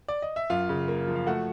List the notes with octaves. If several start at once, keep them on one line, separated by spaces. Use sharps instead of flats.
D5
D#5
E5
F#2 F4 F5
C#3
A#3
F3
F5
A3 F#4 F#5